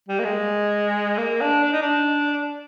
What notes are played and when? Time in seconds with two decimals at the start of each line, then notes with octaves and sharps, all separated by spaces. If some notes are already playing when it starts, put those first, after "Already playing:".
0.08 G3
0.19 A#3
0.24 G#3
1.18 A#3
1.41 D4
1.64 D4
1.73 D#4
1.82 D4